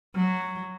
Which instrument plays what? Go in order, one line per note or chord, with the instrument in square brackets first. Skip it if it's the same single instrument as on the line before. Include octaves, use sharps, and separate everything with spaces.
[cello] F#3